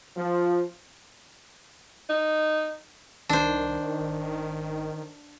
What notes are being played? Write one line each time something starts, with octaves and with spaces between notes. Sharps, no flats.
F3
D#4
C2 D#3 D4 C5
G#1